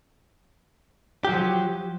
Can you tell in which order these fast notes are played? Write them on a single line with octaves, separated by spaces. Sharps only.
G4 F#3 F3